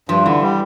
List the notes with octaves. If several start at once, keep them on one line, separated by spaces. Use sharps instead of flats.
G2 F3
D3 E3
G3